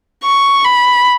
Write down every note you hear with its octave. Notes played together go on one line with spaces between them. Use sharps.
C#6
B5